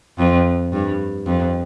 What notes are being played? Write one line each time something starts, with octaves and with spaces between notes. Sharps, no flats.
F2
G2
F2